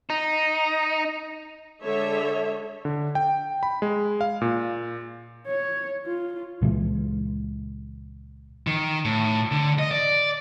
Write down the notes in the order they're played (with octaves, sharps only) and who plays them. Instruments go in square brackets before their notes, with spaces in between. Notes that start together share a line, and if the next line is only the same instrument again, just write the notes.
[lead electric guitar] D#4
[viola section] D3 G#3 A4 C#5 E5
[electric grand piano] D3
G5
B5
G#3
F5
A#2
[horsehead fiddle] C#5
F4
[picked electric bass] C#2 A#2 E3 G#3
[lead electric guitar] D#3
A2
D3
D#5
D5